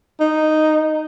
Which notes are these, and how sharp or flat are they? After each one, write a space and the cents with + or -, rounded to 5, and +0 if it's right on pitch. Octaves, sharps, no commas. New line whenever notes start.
D#4 -5